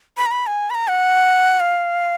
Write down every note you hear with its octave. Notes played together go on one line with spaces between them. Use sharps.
B5
A#5
B5
G#5
B5
A#5
F#5
F5